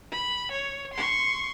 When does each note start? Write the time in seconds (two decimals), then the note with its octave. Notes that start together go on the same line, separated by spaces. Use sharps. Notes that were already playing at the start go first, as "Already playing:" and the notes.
0.12 B5
0.51 C#5
0.94 C6 C#6